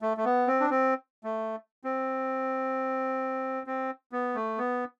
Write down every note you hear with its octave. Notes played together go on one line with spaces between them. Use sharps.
A3
A3
B3
C4
D4
C4
A3
C4
C4
B3
A3
B3